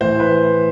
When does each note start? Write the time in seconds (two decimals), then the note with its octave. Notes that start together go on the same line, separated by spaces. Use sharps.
0.01 A2 E3 C5
0.20 B4